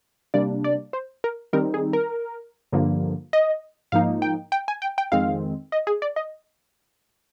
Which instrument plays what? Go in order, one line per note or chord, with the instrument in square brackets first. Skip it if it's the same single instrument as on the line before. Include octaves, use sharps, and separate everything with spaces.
[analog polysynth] C3 G3 A#3 D4 D5
D5
C5
A#4
D#3 G3 C4 D#4 A#4
G#4
A#4
G2 D3 F3 A#3
D#5
G#2 F3 A#3 D#4 F5
G5
G5
G#5
G5
G5
F2 D#3 G#3 C4 F5
D#5
G#4
D5
D#5